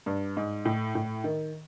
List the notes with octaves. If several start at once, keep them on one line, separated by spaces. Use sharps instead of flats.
G2
G#2
A2
A2
D#3